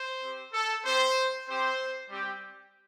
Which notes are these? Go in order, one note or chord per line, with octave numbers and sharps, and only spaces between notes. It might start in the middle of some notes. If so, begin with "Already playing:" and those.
Already playing: C5
C4 G4
A4
C4 G4 C5
C4 G4 C5
G3 C4 G4